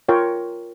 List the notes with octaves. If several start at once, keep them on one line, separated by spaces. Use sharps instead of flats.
F4 A#4 C#5 G5